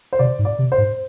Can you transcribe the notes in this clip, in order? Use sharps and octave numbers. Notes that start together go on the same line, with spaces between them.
C5
C3 D5
G#2
D5
C3
C5
G#2